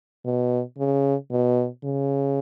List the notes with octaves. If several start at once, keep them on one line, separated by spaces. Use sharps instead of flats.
B2
C#3
B2
C#3